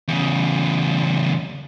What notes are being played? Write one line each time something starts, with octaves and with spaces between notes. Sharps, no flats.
E2 C#3